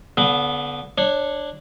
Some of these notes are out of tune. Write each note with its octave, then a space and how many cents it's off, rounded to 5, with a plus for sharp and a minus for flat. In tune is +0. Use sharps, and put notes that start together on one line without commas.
D3 -35 B3 +0
D4 +5 C#5 -20